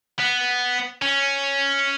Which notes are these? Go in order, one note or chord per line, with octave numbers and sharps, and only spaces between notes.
B3
C#4